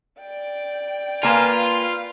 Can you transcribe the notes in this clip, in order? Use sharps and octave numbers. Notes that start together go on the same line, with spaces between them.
D5 G5
A#3 F4 B4 F5 G#5